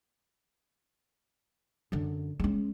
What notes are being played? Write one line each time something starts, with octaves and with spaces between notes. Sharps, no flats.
F#2 D3
G#3 C#4